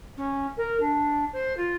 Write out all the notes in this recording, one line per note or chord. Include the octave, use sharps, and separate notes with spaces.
C#4
A#4
D4
C5
F4